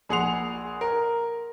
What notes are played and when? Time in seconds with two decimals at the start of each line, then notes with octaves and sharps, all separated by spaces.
0.09 A#1 G#4 F#5 C6 F7
0.81 A#4